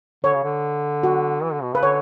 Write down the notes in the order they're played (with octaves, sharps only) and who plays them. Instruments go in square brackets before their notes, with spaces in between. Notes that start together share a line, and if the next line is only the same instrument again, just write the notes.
[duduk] D3 [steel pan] C#5
[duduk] C#3
D3
[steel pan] F#4
[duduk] E3
D3
B2
[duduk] C#3 [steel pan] B4
[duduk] D3 [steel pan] C#5